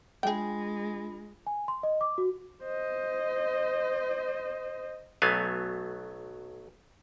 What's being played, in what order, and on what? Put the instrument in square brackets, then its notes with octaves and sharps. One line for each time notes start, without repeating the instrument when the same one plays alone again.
[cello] G#3 [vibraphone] D4 F4 B5 [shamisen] G#4 G5
[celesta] G#5
C6
D#5
D6
F#4
[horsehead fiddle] C5 D#5
[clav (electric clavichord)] B1 F#3 A3 B3 F5 G#5